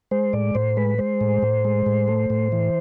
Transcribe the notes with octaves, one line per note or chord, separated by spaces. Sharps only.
G#3 C5
A2 D5
A2 C5
G#3 B4
G#3 C5
A2
A2
G#3
A2
A3
A2
E3